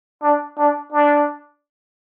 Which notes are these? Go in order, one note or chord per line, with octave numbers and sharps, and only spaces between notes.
D4
D4
D4